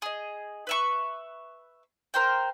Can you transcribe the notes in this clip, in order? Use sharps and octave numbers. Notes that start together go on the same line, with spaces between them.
G#4 D#5
B4 E5 C#6
A#4 C5 G5